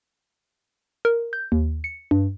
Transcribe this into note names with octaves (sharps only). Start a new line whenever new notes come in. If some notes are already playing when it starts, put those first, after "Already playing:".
A#4
G6
D#2
C#7
G2